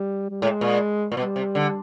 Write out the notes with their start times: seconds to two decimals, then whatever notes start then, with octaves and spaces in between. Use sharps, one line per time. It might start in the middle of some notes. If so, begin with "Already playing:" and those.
Already playing: G3
0.30 G3
0.42 A2 G#3
0.61 A#2
1.12 A#2
1.17 B2 G3
1.36 C3
1.55 D3